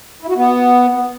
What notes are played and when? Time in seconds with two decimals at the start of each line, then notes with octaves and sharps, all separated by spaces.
0.22 E4
0.29 F#4
0.36 B3